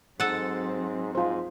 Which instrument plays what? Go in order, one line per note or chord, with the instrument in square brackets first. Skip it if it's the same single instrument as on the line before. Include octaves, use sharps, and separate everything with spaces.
[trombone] G#2 [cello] F#3 C4 [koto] A4 F#5
[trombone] G#2 [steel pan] F4 C5